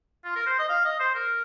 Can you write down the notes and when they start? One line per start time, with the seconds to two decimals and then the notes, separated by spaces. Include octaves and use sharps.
0.24 F4
0.36 A#4
0.46 C5
0.59 D#5
0.69 F5
0.85 D#5
1.00 C5
1.15 A#4